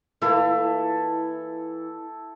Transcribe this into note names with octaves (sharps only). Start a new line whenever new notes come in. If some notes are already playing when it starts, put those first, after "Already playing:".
E3 A#3 E4 F4 A4